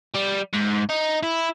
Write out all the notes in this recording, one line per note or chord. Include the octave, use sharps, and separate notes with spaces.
G3
G#2
D#4
E4